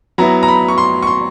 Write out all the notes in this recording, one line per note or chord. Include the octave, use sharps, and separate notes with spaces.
F#3 B3 E4 A#5
A#5
B5
C#6
C6
C#6
C6